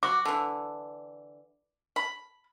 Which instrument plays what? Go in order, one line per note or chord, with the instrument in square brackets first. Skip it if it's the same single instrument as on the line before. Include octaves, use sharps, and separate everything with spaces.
[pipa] F#4 [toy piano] D6
[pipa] D3 E3
B5